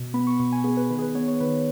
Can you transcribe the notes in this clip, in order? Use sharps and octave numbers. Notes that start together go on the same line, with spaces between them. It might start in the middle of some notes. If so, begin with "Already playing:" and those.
Already playing: B2
B3 B5
C#6
B2 C#6
G#5
B3 G#4
B4
D#3 B4
G#4
B4
B3 C#5
C#5
D#3 B4